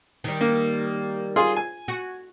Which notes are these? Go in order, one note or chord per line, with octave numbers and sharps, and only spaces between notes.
D#3 G3
A#3
F4 G#4 C6
G#5
F#4